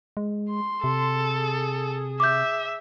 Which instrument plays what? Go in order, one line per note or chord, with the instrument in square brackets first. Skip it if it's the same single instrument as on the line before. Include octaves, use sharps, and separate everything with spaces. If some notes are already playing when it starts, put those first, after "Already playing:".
[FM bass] G#3
[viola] C6
[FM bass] C3 [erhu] A4
[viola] G#4
[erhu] E5 [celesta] D6 G6